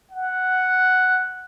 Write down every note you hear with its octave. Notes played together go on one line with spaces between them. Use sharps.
F#5